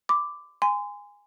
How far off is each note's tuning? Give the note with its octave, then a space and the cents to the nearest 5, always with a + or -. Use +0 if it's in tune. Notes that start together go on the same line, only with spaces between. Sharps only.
B5 +40 D6 +0
G#5 -15 C6 -30